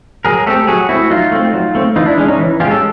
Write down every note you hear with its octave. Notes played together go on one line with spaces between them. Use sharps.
F#3 G#4 A#4
A3 C4 G4 A4
F#3 F#4 G#4
A3 C4 E4 F#4
F#3 D#4 F4
A3 C4
F#3
A3 C4
E3 D#4 F4
D4 E4
G#3 C#4 D4
C#4 D#4
E3
G#3 C#4 F4 G4
G4 A4